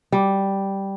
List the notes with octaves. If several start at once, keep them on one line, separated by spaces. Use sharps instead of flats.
G3